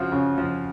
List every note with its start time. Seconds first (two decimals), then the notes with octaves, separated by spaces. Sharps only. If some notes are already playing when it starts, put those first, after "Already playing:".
Already playing: C#3 F3 F4 F#4
0.12 C#3
0.38 F3